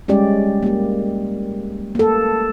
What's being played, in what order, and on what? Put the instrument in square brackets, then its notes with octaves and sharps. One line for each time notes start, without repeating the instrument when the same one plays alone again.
[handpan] G3 G#3 C#4 G4 D5
A#3 G4
A#3 A4